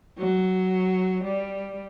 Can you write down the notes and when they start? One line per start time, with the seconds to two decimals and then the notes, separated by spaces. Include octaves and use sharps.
0.18 F#3
1.23 G3